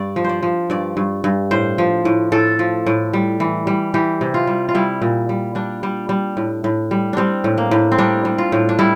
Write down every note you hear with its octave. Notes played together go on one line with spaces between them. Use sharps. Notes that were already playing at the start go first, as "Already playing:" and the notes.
Already playing: G2 D5
F3
C5 D5
F3
G2 D5
G2
G2
A2 C5
F3
A2
A2 A4
F3
A2
G3
E3
G3
E3 G4
C3
F4
G3
F4
G3 E4
A#2
G3
G3 D4
G3
G3
A2
A2
G3
G3 C4 D4
A2
A#3
A2
C4
G3 D4
G3
F4
A2
D4
G3 E4